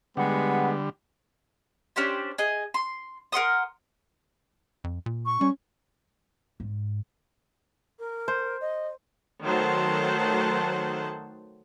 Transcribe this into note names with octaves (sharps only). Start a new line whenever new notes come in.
D3 G3 G#3 B3 G4 G#4 F#5
C#4 D4 G4 C5
G#4 D#5
C6
A#4 F#5 C6 D#6
F2
A#2
C#6
G3 C#4
G#2
A#4
C5
D#5
D#3 F#3 A3 C5 F#5 A5